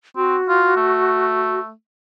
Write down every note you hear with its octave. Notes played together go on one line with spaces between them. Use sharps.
C4 F#4
F4
A3